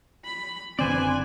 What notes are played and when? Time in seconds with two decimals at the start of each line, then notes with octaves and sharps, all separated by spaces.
0.25 B5
0.79 F#1 D3 C4 B4 C5 D5 G#5